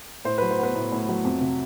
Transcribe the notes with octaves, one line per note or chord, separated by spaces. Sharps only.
A2 C5
B4
F#3
C5
B3 B4
A2
A2
F#3
F2
C3